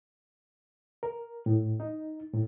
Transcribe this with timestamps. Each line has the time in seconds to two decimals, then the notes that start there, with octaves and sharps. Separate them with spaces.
1.03 A#4
1.46 A2
1.80 D#4
2.34 A2